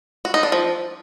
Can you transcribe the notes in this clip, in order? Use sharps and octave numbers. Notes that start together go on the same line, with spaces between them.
F#4
D#4
D4
F3